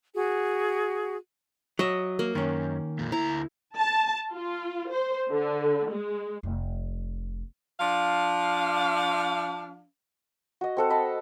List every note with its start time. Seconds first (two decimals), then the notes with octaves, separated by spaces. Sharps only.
0.14 F#4 G#4
1.79 F#3 D#5 E5
2.19 A#3
2.35 F#2 D#3 C#4
2.99 F2 A#2
3.12 D2 E4 A#5
3.76 A5
4.33 F4
4.90 C5
5.31 D3
5.90 G#3
6.43 F1
7.80 F3 D4 F5
10.61 F#4 D#5
10.77 C4 A4 F#5
10.90 D#5 A5 B5